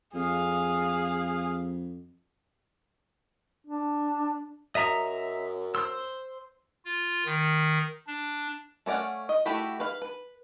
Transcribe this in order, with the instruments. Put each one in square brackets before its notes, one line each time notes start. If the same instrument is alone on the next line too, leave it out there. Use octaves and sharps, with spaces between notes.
[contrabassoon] F2 [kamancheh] G#4 F5
[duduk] D4
[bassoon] F#2 [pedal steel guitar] D#5 E5 A#5
[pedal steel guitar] C5 C6 E6
[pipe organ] F4
D#3
D4
[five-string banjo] A3 C#4 D5 F5 F#5
D#5
A3 E4 F#4 G4 B5
B4 F5
B4